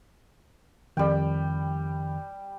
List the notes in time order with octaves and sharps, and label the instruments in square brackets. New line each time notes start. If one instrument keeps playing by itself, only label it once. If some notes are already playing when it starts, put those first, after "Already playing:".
[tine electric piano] F2 D#3 [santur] G3 G5